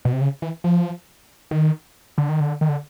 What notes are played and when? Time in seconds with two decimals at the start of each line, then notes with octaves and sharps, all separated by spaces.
0.05 B2
0.13 C3
0.21 C#3
0.42 E3
0.64 F3
1.51 D#3
2.18 D3
2.29 D#3
2.40 D3
2.61 D#3
2.69 D3